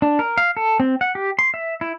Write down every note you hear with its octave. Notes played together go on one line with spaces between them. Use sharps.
D4
A#4
F5
A4
C4
F#5
G4
C6
E5
E4